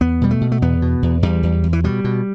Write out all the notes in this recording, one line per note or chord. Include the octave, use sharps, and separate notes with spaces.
E2 B3
B2 G3
A3
B2
A3
E2 B3
B2
E2
E2 G3
E2
E2
E3
B2 G3
B2